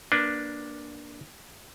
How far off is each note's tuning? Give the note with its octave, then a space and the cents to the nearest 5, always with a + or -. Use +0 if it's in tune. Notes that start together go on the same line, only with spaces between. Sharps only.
A#3 +15 D4 +0 B4 +0